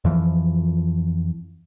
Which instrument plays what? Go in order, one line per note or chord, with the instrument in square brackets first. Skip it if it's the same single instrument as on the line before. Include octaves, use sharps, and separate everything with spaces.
[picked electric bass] F2 E3 F3